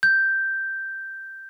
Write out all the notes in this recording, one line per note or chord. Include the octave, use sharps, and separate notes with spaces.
G6